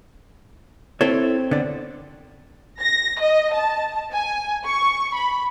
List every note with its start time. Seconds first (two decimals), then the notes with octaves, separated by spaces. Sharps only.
1.01 C4 E4 A4 C#5
1.51 D3 B3 D5
2.81 A#6
3.20 D#5
3.54 A5
4.13 G#5
4.66 C#6
5.16 B5